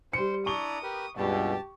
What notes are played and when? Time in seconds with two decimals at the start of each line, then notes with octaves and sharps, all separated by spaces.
0.13 G3 C5 C#7
0.46 D4 E4 A#5 C#6 D#6 G7
0.83 G4 A#4 B4
1.17 C#2 G2 B2 G4 A5